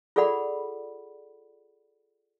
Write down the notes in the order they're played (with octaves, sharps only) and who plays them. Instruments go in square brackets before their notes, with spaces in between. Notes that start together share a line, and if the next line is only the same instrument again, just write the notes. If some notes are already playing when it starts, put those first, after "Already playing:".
[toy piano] F4 G#4 A4 D5 F#5 B5